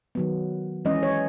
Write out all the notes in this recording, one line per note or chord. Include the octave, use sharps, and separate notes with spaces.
D#3 F#3 B3
E3 G#3 C#4 D#5
C#5